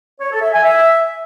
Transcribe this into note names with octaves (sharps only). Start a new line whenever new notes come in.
C#5
A4
E5
G#5
E5